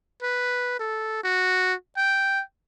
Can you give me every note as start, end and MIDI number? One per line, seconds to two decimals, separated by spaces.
0.23 0.78 71
0.80 1.22 69
1.24 1.74 66
1.97 2.42 79